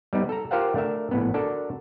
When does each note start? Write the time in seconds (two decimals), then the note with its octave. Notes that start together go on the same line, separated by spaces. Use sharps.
0.13 G3 B3 D#4
0.29 A4 A#5
0.51 F4 G4 A#4 C5 F5 F#5
0.75 A3 D4 A#4 E5
1.11 A#1 A2 B3
1.34 D4 F#4 A4 A#4